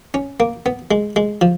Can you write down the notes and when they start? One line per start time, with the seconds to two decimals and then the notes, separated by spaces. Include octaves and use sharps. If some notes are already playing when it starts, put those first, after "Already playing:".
0.14 C#4
0.40 A#3
0.66 B3
0.91 G#3
1.16 G#3
1.41 F3